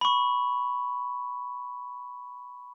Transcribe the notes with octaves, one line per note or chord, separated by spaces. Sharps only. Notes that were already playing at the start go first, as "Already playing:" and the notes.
B5 C#6